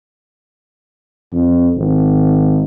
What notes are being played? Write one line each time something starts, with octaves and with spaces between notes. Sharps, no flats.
F2
G#1